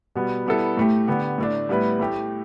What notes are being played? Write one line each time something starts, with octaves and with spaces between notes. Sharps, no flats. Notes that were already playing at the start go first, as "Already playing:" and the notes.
B2 G3 B3
G3 B3 E4 A4
A2 A3 G4
D3 B3 G4
A2 A3 D4
A2 G3 B3 E4 B4
A2 A3 G4